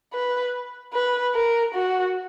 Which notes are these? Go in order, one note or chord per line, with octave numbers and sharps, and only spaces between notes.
B4
B4
A#4
F#4